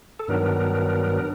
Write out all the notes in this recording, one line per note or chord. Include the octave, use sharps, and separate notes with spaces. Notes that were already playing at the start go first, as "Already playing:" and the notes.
A4
G2 D#3 F#3 B3 D4 A#4